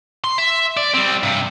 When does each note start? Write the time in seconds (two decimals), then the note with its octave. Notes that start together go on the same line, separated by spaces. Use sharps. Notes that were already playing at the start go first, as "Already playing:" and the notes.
0.24 C6
0.38 E5
0.77 D5
0.94 G3 C4
1.23 G2 C3